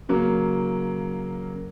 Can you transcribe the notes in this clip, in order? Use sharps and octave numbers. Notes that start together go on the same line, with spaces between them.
C#3 F#3 A#3